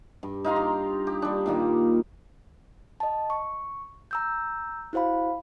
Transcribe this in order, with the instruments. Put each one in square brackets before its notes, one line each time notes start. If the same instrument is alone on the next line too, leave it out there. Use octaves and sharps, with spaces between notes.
[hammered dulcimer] G2
D#4 F4 A#5 C6
G4
G4
G3 D4
A#2 D#3 A#3 G4
[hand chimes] D#5 A5
C#6
A#5 E6 G6
E4 F#4 C5 F5 B5